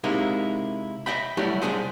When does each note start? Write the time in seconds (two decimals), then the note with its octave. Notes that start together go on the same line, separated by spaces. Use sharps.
0.04 C3 G#3 A#3 D#4 E4
1.06 D#5 E5 G5 B5
1.37 F#3 G3 A3 E4 F#4 G4
1.62 C2 F#2 D4 G#4 C5